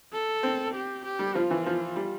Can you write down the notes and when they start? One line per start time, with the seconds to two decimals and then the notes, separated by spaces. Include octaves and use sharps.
0.12 A4
0.43 C4
0.74 G4
1.04 G4
1.19 G3
1.35 F3 F4
1.51 E3
1.66 F3
1.96 G3